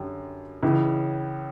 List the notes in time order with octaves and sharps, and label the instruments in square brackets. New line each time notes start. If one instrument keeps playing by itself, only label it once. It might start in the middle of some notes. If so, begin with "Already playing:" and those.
Already playing: [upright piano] F#2 D3 G3
C#2 C#3 E3